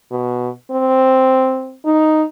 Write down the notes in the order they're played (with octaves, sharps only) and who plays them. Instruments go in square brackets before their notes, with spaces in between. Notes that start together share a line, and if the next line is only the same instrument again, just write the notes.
[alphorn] B2
C4
D#4